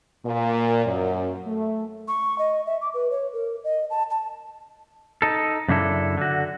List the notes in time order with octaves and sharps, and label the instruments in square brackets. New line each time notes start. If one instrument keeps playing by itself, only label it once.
[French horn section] A#2
F#2
A3
[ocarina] C#6
D#5
E5
D6
B4
C#5
A#4
D#5
A5
A5
[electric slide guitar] D#4 A4
F#2 C#3 D4 E4 A4
D3 F#4